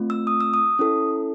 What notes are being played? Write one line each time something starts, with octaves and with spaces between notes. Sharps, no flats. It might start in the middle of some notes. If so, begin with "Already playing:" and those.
Already playing: A3 C4 F4
E6
D#6
E6
D#6
C#4 E4 A4